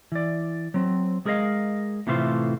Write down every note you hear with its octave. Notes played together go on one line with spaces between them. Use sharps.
E3 D5
F#3 C4
G#3 G#4 A#4 D5 D#5 F5
A2 C3 E3 A3 F4 C5